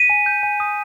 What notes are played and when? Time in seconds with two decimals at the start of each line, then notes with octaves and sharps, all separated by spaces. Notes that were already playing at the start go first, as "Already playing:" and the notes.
Already playing: B6 D#7
0.10 G#5
0.26 G6
0.43 G#5
0.60 D#6